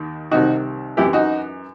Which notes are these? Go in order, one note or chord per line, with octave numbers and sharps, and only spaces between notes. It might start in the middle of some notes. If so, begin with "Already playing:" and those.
Already playing: D#2 D#3
C2 C3 D#3 D#4 F#4
F#2 E3 E4 G4
D#4 F#4